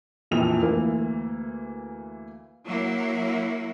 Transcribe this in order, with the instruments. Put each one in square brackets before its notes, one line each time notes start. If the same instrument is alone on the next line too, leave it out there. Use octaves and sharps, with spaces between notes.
[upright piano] E1 A#1 F2 A#2 E3 F7
D2 E3 A#3
[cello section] F#3 A#3 E4